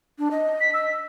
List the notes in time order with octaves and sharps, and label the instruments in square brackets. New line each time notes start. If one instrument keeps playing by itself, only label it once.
[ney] D4
D#5
[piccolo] B6
E6